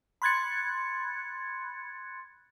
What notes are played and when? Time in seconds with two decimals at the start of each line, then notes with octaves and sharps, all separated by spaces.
0.22 B5 C6 F#6 G#6 A6 C#7